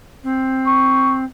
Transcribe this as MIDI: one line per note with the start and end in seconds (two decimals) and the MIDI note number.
0.23 1.24 60
0.67 1.16 85